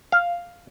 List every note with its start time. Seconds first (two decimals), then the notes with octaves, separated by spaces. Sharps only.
0.12 F5